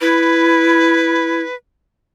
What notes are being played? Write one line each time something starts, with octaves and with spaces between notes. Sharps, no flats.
E4 B4